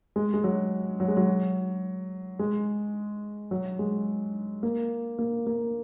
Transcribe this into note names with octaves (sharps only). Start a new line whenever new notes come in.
G#3
G#3
F#3
F#3
G#3
F#3
G#3
F#3
G#3
A#3
A#3
A#3